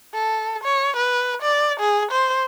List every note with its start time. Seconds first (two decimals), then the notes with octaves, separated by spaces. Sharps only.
0.14 A4
0.64 C#5
0.97 B4
1.42 D5
1.80 G#4
2.11 C5